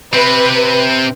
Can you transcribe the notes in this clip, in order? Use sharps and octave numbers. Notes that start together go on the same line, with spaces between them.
C3 C4 B4